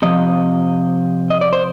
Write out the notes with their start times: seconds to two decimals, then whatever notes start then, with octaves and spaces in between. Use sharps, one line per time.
0.02 C3 F3 D#5
1.30 D#5
1.41 D5
1.53 C5